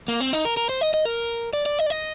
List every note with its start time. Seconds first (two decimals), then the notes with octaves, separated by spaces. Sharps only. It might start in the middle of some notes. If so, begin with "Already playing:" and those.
0.08 A#3
0.20 C4
0.33 D#4
0.45 A#4
0.57 A#4
0.69 C5
0.81 D#5
0.94 D#5
1.05 A#4
1.53 D5
1.66 D5
1.79 D#5
1.86 D5
1.90 D#5